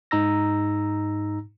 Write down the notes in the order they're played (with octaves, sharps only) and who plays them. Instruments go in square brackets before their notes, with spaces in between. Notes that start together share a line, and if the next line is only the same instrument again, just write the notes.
[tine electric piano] G#2 D#4 A#5 E6 A#6